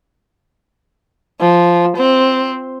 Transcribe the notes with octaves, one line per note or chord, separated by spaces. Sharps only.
F3
C4